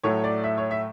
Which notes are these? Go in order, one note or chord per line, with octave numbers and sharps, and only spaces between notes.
A2 F#3 A3 C#5
D5
E5
C#5
E5